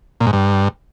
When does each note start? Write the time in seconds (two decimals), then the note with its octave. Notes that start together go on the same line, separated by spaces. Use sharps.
0.21 A#2
0.27 G#2
0.33 G2